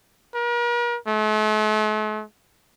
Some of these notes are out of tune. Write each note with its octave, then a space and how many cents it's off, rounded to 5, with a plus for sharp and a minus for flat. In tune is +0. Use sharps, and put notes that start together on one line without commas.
A#4 +45
A3 -45